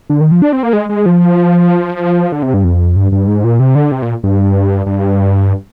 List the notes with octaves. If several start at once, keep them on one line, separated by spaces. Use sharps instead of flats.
D3
D#3
F3
D4
C4
A#3
G#3
G#3
F3
D3
C3
G2
F2
G2
G2
G#2
A#2
C3
D3
C3
A#2
G2
G2